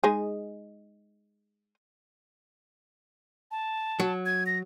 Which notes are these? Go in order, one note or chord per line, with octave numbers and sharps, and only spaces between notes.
G#3 D#4 G#4
A5
F#3
G#6
A#6